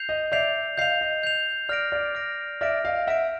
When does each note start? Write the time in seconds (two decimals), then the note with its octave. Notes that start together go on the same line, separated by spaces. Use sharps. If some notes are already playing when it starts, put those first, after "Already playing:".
Already playing: G6 C7 F7
0.09 D#5
0.32 D5 E5 G6 C7 F7
0.77 D#5 F5 G6 C7 F7
1.01 D#5
1.23 G6 C7 F7
1.69 D5 F6 A#6 D7
1.92 D5
2.15 F6 A#6 D7
2.61 D5 E5 F6 A#6 D7
2.84 D#5 F5
3.07 E5 F#5 F6 A#6 D7